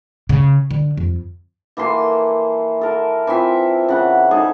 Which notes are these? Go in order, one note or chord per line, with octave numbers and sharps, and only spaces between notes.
C#3
D3
F2
E3 A#3 A4 C6
A4 A#4
E3 C4 F4 E5
C#3 F#5
D#4 G#4 A4